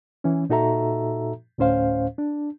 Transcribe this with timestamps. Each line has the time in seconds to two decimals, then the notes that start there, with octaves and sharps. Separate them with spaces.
0.24 E3 C#4
0.50 A#2 D#4 F#4 A4 E5 A#5
1.58 D2 A2 C#4 C5 F5
2.18 D4